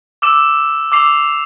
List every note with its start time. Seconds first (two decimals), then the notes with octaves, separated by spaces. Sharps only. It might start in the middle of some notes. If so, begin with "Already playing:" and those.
0.22 D6 E6 E7
0.92 D6 E6 C7 F7